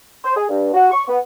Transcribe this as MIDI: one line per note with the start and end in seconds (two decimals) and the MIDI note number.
0.24 0.35 72
0.36 0.45 68
0.49 0.69 43
0.73 0.90 66
0.92 1.03 85
1.08 1.19 59